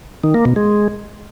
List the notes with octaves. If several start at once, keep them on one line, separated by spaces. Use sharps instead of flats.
D#3
A#3
B2
G#3